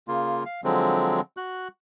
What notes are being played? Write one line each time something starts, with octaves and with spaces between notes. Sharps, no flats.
C#3 A#3 F4
F5
D3 F3 F#3 G#3 C4
F#4 F#6